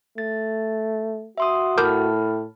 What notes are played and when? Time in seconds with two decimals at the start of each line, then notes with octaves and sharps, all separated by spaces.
0.18 A3 A6
1.38 F#4 E5 C6 D#6
1.78 A2 A#4 A5 B5 D6 F6 G6